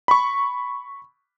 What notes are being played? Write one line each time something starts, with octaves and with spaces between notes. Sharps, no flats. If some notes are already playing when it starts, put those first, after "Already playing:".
B5 C#6